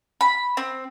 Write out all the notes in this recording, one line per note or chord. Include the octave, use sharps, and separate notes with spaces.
B5
C4